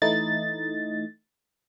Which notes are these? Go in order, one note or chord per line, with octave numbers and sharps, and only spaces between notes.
E3 A3 D#4 E4 D#5 A6